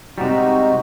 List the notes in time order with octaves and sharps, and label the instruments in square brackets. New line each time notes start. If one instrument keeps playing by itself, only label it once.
[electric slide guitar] C3 G3 [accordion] G#3 D#4 F#4